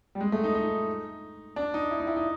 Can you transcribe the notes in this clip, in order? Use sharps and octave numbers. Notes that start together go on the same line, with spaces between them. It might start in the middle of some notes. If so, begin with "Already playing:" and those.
G3
G#3
A3
D#4
D#4
D4
D#4
E4
D#4
E4
D#4